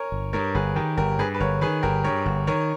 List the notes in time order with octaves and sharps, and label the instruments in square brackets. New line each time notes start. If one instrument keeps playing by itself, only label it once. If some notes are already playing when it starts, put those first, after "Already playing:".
Already playing: [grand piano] A#4 C#5 G#5
[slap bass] G1
[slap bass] G2 [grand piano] A#4 C#5
[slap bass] G1 [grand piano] G#4 B4
[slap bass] D#3 [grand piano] G4 A#4
[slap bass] G1 [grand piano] G4 A#4
[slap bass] G2 [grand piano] G#4 B4
[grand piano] B4
[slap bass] G1 [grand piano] A#4 C#5
[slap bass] D#3 [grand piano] G#4 B4
[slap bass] G1 [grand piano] G4 A#4
[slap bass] G2 [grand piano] A#4 C#5
[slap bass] G1
[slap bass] D#3 [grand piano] A#4 C#5